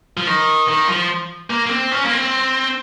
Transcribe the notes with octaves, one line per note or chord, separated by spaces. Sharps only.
F3
D#3
D#3
F3
A#3
A#3
C4
C#4
A#3
C4